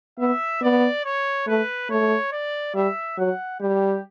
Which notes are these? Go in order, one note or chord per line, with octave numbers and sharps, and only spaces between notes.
B3 E5
B3 D5
C#5
A3 B4
A3 C#5
D5
G3 E5
F#3 F#5
G3 G4